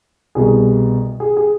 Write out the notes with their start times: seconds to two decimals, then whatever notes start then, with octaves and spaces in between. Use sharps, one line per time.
0.35 C2 B2 G3 G#4
1.20 G#4
1.37 G#4